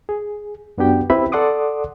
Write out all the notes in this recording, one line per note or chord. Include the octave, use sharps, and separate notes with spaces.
G#4
F#2 B3 D4 F#4 G4 G5
C4 E4 G4 B4 E5 B5
A4 D5 F#5 C6 D6 D#6